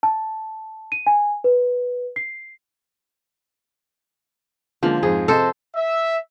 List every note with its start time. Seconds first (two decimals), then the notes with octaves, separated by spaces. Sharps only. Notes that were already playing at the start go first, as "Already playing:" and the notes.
0.03 A5
0.92 D#7
1.07 G#5
1.44 B4
2.16 C7
4.83 D3 F3 G#3 A#3
5.03 F2 G#2 G#4
5.28 C3 A4 C5 D#5
5.76 E5